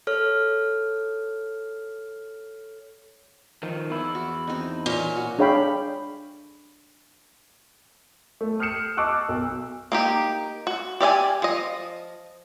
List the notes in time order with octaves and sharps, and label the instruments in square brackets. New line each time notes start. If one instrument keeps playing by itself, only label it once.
[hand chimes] A4 C#5 F6
[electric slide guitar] D#3 F3
E2 E4
[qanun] F#4
C4 D#4
[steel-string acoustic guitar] A#2 C#4
[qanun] F#4
[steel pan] D4 G#4 C#5 F5 G5 B5
[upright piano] A3
D#6 F6 G6 C7 C#7 E7
D#5 A5 C#6 D6 E6 F#6
B1
[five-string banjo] A#3 D#4 G4
F#4
G4 D5 E5 G#5
F3 D#5